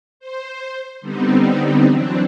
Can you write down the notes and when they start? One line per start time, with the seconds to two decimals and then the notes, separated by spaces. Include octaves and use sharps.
0.20 C5
1.01 D3 G3 B3 C4 D#4
1.88 E3 F#3 C4 D4